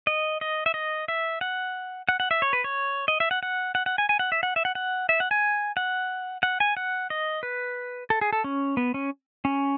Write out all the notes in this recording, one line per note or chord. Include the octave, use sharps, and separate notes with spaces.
D#5
D#5
E5
D#5
E5
F#5
F#5
F#5
E5
C#5
B4
C#5
D#5
E5
F#5
F#5
F#5
F#5
G#5
G#5
F#5
E5
F#5
E5
F#5
F#5
E5
F#5
G#5
F#5
F#5
G#5
F#5
D#5
B4
A4
G#4
A4
C#4
B3
C#4
C#4